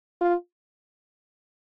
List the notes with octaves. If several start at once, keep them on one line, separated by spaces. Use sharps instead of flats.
F4